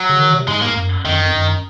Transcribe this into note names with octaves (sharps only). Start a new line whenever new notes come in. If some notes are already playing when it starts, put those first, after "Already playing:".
Already playing: F#3
C#3
D#3
C3
G#2 G#3
A#3
F#2
F2 D#3
F#2
F2
F#2